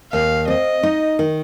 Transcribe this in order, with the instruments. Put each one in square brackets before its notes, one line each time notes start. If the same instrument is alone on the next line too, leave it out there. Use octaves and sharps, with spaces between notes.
[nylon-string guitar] D#2 [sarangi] F5
[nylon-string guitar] C4 [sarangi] D#5
[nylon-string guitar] D#4
D#3